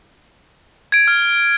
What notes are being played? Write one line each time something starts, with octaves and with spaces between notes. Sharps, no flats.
G#6 D7
F6